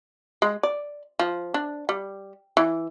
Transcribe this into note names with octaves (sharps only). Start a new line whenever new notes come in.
G#3
D5
F3
D4
G3
E3